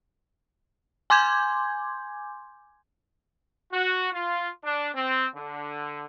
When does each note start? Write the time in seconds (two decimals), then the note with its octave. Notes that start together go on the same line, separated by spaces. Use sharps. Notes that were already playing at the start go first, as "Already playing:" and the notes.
1.10 G#5 C6 D6 G6 G#6
3.71 F#4
4.12 F4
4.63 D4
4.94 C4
5.34 D3